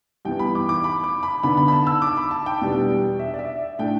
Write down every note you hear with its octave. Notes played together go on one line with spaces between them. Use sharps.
G2 E3 B3 G5
B5
D6
D6
B5
D6
B5
D3 B3 D4 B5
B5
B5
A5
E6
D6
B5
A5
G5
E2 B2 G3 B3 D4
E5
D5
E5
A2 A3 D4 G5